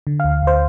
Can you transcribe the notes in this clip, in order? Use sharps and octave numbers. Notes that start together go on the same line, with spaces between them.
D3
D2 F5
D2 C5